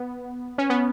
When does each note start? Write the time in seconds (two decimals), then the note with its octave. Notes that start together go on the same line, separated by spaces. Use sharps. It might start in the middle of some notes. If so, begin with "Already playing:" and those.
Already playing: B3
0.58 C#4
0.70 B3